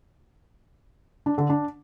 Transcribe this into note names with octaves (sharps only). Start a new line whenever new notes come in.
D4
D3
D4